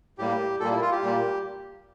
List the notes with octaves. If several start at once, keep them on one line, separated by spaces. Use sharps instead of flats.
A2 G3 A#3 G4
A#2 G3 A#3 A4
E4
F4
G4
A#2 G3 A#3